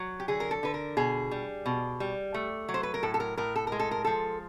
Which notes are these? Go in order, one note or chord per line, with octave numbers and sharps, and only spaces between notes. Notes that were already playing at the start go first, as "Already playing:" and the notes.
Already playing: F#3
G4
D3 G#4
A#4
A4
D3 B4
A#4
B2 G#4
G3
B2
G3
A3
F#3
C5
B4
A#4
A2 A4
A4
A#4
A2 A#4
A4
G#3 A#4
A4
A#4
F3 A4